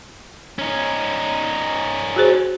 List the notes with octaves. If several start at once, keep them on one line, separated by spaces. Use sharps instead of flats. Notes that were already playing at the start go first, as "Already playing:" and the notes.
C#4 D#4
F#4 G#4 C5